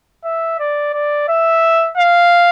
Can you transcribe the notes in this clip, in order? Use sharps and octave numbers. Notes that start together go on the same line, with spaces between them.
E5
D5
D5
E5
F5